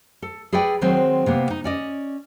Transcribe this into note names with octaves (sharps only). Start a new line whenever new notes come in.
A4
G#4 A4 B4 D5 G5
D#3 F#3 G#3 C4 C5
C3 A#3 B3
D#4
C#4 D5 D#5